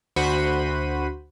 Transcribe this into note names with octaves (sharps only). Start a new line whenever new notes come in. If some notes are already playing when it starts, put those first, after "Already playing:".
D2 F#4 C5 B5 D#7